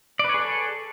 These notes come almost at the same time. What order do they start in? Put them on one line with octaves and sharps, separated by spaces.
D5 B4 C#5 G#4 A4